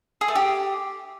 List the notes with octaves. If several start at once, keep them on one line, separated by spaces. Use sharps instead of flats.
G#4
A3
G4